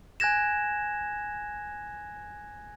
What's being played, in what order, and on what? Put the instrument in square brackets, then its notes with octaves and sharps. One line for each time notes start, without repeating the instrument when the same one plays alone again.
[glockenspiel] G#5 F#6 G#6 A#6 E7